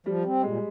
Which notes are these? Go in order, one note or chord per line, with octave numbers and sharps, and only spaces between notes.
F3 G3
C4
A#2 G#3